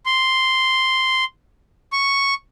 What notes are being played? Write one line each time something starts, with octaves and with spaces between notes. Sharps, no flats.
C6
C#6